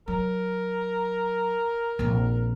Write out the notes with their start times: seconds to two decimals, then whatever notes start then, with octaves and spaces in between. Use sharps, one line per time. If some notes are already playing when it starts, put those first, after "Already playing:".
0.08 F#3 A#4
1.99 A#1 F2